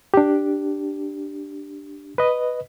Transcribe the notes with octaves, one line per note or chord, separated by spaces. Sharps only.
D4 G4
B4 D#5